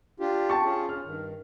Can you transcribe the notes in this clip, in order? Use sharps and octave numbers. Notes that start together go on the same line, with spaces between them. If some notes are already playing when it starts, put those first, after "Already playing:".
D4 F4 G4
G5 A5 C#6
C#4 F4 G#4
C#4 F6
G2 D#3